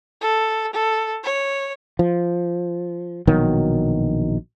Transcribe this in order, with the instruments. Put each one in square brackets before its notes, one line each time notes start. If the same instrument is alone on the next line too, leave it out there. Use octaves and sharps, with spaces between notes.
[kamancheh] A4
A4
C#5
[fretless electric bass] F3
A#1 B2 D#3 F#3